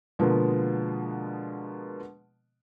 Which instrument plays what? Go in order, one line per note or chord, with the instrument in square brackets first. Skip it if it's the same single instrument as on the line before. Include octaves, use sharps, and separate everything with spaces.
[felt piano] B2 D3 F3 G#3 A#3 B3